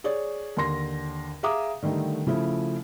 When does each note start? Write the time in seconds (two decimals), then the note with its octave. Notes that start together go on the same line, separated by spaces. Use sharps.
0.04 G#4 C#5 D5
0.57 D#2 D3 C6 A#6
1.43 G#4 E5 F5 A#5 D6 D#6
1.83 D3 D#3 G3 A3 D#4
2.27 C#3 F3 A3 E4